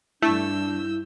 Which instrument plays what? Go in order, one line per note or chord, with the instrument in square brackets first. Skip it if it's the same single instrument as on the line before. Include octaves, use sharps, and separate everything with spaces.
[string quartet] G2 E6 G6 [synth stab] A3 [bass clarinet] D4 [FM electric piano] E4